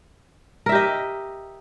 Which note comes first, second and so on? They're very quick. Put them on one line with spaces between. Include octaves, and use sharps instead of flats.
A#4 E5 G4 D#5